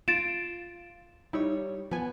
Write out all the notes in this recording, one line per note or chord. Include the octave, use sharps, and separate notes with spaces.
F4 A6 D7 E7
G3 D#4 E4 C#5
F3 B3 G#5